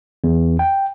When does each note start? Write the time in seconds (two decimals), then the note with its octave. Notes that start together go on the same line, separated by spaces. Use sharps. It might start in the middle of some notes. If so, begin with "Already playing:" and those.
0.24 E2
0.59 G5